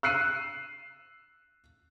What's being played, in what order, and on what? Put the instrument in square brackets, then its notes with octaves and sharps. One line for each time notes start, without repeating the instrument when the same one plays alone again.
[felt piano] E6 F#6 C7 D#7